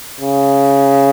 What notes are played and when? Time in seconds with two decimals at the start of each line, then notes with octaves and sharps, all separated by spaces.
0.20 C#3